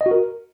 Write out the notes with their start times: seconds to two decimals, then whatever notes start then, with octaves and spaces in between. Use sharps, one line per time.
0.01 D#5
0.06 F#4
0.11 A#4